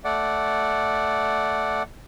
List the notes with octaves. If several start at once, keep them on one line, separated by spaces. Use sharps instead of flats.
A3 D5 F#5